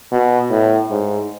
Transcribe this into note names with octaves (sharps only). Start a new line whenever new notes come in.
B2
A2
G#2